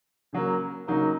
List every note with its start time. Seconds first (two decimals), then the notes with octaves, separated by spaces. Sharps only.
0.33 C#3 F#3 A#3
0.87 C#3 F#3 A#3 D#4